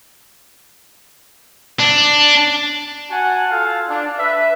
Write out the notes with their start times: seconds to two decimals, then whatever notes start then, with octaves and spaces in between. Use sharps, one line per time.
1.79 D4
3.10 F#4 F#5 G#5 A5
3.50 F4 A4 F5
3.89 D4
4.18 B4 E5